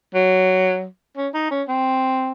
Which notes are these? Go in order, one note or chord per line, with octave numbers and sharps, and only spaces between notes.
F#3
C#4
D#4
C#4
C4